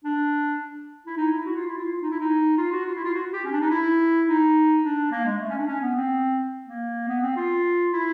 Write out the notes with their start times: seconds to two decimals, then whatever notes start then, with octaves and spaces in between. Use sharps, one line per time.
0.04 D4
1.07 E4
1.17 D#4
1.31 E4
1.45 F#4
1.56 F4
1.67 E4
1.77 F4
2.01 D#4
2.10 E4
2.20 D#4
2.58 F4
2.72 F#4
2.86 F4
2.95 E4
3.05 F4
3.14 F#4
3.33 G4
3.45 C#4
3.52 D4
3.61 D#4
3.70 E4
4.27 D#4
4.83 D4
5.11 A#3
5.25 G#3
5.39 A3
5.49 C#4
5.58 D4
5.67 C#4
5.81 B3
5.96 C4
6.66 A#3
7.08 B3
7.22 C4
7.36 F4
7.93 E4